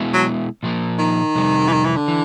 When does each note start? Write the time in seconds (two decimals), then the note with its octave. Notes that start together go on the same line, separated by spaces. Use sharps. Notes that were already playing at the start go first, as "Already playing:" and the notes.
Already playing: B2 G#3 B3 E4
0.13 F#3
0.63 A#2 F3 A#3
0.98 D#3
1.35 F2 C3 G3
1.68 E3
1.72 D#3
1.84 E3
1.96 D3
2.08 E3